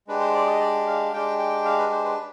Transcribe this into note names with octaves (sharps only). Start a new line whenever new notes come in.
G#3 D4 G4 B4
C5
D5
D#5
D5
F5
G#3 D4 G4 G5
G5
F5
B4
C5
B4